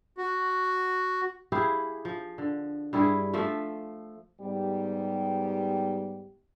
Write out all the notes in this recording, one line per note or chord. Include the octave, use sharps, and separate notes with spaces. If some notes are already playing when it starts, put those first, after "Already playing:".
F#4
E4 G4 G#4 F5
F3
D3
G2 G3 E4 G#4
F3 A3 F4 E5
G#2 G3 B3 G4